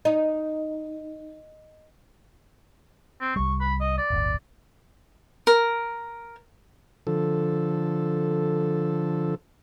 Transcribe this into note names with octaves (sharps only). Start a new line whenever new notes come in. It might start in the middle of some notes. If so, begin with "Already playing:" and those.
D#4 D#5
C4
C2 G3 C#6
B5
D#5
D5
D1 G1 D2
A#4
D3 F3 A4